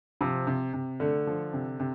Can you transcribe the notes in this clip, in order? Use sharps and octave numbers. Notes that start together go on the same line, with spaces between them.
C3 F3
C3
C3
D3 A3
F3
C3
C3